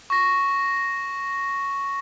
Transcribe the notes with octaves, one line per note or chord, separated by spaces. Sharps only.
C#6 A#6